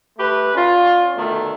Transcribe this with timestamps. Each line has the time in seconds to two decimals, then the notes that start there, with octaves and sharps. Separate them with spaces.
0.18 A3 G4 B4
0.55 C#4 D4 F4
1.17 B2 D3 D#3 A3